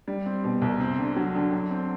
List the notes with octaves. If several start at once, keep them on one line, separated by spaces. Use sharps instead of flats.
G3
C4
B2
C2
C4
D3
F#3
D3
F#3
C4